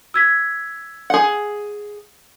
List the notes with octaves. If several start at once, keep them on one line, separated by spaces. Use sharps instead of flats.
E6 G#6 B6
G#4 F#5